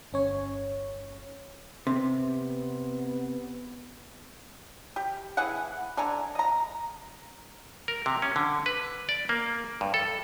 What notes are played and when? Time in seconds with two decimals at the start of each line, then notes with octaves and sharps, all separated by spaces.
0.13 G1 C#4 C#5
1.87 C3 B3
4.96 G4
5.37 E3 G#4 F#5
5.97 D3 G#5 A#5
6.35 D#5 A#5
7.88 A#4
8.06 C3
8.22 C#4
8.36 D3
8.66 B4
9.09 D5
9.29 A#3
9.81 G2
9.94 A4